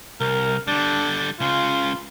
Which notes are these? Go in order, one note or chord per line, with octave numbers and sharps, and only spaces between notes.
C2 A#4
D3 G3 D4
C#2 C#3 F4